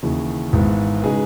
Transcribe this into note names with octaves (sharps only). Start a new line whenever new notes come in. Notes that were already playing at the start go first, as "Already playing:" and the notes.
D#2 C#3 E3
G#1 G#2 E3 B3
C#3 G#3 D#4 G#4 B4